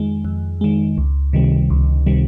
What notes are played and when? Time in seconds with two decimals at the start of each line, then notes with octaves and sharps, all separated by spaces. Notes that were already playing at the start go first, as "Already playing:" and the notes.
Already playing: F2 D#3 G#3
0.25 F2
0.61 D#3 G#3
0.98 C#2
1.33 C3 D#3 G3
1.70 C#2
2.06 C3 D#3 G3